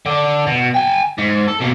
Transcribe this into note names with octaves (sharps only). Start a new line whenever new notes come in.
D3 D4
B2
G5 G#5
G#2
A4
B2 A#3